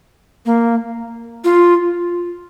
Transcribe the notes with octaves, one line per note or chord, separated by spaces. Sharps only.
A#3
F4